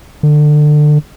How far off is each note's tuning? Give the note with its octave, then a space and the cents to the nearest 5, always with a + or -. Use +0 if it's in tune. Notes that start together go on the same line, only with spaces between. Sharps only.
D3 +25